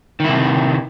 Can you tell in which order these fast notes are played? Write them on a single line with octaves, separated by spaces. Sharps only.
D#3 E4 C3